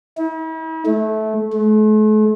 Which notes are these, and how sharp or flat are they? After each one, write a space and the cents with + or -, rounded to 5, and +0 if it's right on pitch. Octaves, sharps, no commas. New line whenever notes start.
E4 -45
A3 -20
A3 -45